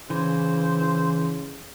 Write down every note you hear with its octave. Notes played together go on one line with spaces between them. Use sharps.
C#3 E3 C5